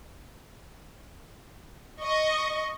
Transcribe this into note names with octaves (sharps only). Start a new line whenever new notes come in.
D#5 C#6